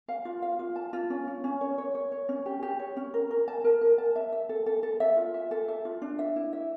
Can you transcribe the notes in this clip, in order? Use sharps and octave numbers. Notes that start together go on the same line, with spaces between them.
F5
F4
F5
F4
A5
F4
C#4
C#4
C#4
C#5
C#5
C#5
C#5
C#4
G4
G4
C#5
C#4
A#4
A#4
A5
A#4
A#4
A5
E5
E5
A4
A4
A4
E5
F4
E5
A4
E5
F4
D4
E5
E4
E5